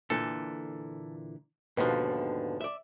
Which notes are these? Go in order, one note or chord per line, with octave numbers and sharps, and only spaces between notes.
A#2 D3 E3 A4
D#2 G#2 B2 D3 F3 B4
D5 E5